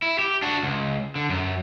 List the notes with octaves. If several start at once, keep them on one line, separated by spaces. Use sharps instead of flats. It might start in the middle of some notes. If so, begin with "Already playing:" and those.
E4
G4
D4 F#4
C#2
D3
F#2